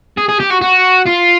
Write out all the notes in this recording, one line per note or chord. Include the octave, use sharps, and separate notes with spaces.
G#4
G#4
G4
F#4
F#4
F4